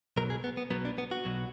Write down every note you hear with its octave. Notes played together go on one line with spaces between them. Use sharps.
B1 B2 F#3 A#4
G#4
B3
B3
B1 B2 F#3 B3
D4
B3
F#4
B1 B2 F#3